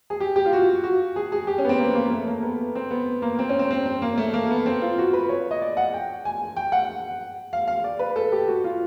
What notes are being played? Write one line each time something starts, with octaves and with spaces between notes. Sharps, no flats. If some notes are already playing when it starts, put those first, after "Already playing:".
G#4
G4
G4
F4
F#4
F#4
G#4
G#4
G4
C#4
B3
C4
A#3
B3
A#3
A3
A#3
B3
C4
B3
A#3
C4
C#4
C4
C4
C4
A#3
A3
A#3
B3
C4
F4
F#4
B4
C#5
D#5
D5
F#5
G5
G#5
G5
F#5
F5
F5
D5
B4
A4
G4
F#4
F4